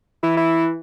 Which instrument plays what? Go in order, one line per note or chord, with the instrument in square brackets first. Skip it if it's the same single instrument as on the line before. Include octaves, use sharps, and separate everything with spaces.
[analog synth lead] E3 [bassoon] E4
[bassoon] E4